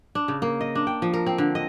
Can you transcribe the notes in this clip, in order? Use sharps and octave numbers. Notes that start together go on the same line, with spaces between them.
D4
C#3
A#3
D#5
D4
G5
F3
A#4
C4
D3
D#5